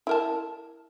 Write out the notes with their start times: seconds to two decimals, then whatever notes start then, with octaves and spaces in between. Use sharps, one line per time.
0.07 E4 A#4 A5